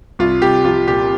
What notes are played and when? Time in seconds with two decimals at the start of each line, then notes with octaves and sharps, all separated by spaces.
0.19 C2 F4
0.42 C2 G4
0.65 F3 F4
0.87 A#2 G4